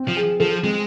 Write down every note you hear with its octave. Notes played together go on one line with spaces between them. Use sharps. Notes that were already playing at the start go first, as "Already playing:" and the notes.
Already playing: C4
F3
G#4
F3 A4
G#3 C4